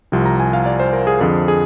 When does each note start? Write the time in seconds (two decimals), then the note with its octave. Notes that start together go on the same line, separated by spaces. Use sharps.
0.12 C2 C3 F3
0.26 A#5
0.40 G#5
0.53 F5
0.66 D5
0.80 C5
0.93 A#4
1.07 G#4
1.21 F2 D3 F3 G#4
1.48 G#4